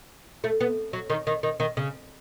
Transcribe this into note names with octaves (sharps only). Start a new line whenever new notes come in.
A3
B3
F#3
D#3
D#3
D#3
D#3
C#3